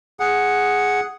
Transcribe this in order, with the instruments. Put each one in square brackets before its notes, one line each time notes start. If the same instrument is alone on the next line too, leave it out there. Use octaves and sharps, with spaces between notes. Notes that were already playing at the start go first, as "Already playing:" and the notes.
[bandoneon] G#4 F#5